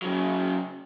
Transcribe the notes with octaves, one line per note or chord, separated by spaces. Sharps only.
C#3 F#3